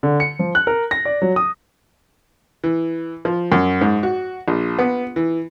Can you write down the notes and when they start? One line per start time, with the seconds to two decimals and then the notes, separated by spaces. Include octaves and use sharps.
0.03 D3
0.20 C#7
0.39 F3
0.55 F#6
0.67 A#4
0.91 A#6
1.05 D5
1.22 F#3
1.36 D#6
2.64 E3
3.25 F3
3.52 F#2
3.81 G#2
4.03 F#4
4.48 A#1
4.79 B3
5.16 E3